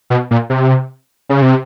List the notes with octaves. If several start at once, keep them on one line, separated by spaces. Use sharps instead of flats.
B2
A#2
C3
C#3
C3